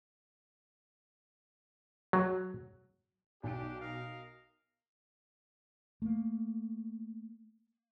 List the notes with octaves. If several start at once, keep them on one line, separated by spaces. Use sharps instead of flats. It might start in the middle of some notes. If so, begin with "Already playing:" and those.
F#3
B1 D4 G4 D7
A#4 D#5 F5
A3 A#3